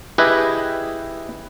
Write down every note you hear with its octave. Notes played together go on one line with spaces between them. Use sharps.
E4 G4 G#4 B4 D#5